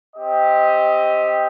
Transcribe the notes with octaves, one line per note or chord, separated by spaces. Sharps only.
C4 G4 D#5